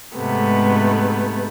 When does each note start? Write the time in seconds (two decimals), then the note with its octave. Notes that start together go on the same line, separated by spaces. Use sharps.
0.16 G#2 C3 A3 B3